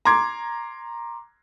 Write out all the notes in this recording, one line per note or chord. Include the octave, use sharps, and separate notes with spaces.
A#5 C6 D6 G#6